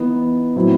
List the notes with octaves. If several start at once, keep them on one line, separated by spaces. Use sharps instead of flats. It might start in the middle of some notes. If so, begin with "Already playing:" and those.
Already playing: E3 B3 D#4
A2 F#3 C4 E4